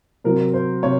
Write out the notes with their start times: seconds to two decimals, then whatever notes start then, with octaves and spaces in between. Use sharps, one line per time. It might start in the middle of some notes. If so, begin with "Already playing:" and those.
0.24 C3 F#3 C4 A#4
0.54 C5
0.83 C3 C#5